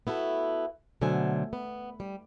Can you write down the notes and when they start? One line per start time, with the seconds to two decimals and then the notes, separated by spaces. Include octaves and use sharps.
0.07 B3 E4 F#4 A4
1.01 B2 D3 F#3 A3 C5 G#5
1.53 B3
2.00 G3